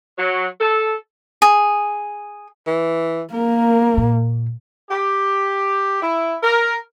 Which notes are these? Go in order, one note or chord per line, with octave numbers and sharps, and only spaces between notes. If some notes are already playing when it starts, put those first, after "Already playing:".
F#3
A4
G#4
E3
A#3 A#4
A#2
G4
E4
A#4